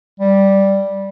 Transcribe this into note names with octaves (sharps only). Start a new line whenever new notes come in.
G3